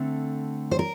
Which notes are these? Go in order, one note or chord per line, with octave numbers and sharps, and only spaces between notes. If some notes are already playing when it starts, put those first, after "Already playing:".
Already playing: D3 A3 C4
C5
A#4